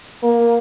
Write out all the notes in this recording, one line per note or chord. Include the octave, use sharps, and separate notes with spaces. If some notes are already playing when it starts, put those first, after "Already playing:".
A#3